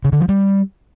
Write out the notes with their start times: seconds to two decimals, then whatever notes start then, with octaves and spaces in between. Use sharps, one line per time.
0.04 C#3
0.13 D3
0.21 F3
0.29 G3